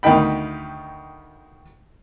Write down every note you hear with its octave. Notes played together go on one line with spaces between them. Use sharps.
D2 D#3 D#4 G5 B5